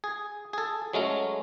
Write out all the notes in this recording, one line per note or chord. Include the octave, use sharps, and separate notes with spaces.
G#4
G#4 A4
F#3 G#3 A3 C#4